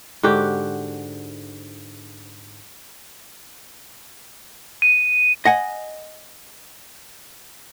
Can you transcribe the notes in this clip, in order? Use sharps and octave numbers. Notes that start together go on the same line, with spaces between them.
G#2 D3 F#4 G4
D#7
D#5 F#5 G#5